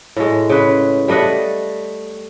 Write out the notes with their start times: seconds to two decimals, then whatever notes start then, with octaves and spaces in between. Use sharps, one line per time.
0.17 A2 G#3
0.50 C#3 B4
1.08 G3 A3 D#5 F#5